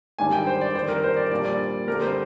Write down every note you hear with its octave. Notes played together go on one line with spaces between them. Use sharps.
G#2 D#3 G3 D4 G#5
G5
C5
D5
F2 D#3 G3 C5
A#4
C5
D5
A#2 G3 A#3 D4 D5
D5
D2 D3 G3 C4 A#4
C5